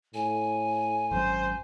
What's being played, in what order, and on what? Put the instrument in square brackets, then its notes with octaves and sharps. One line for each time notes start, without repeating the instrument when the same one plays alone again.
[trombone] A2 [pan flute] G#5
[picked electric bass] G#1 F#2 [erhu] C5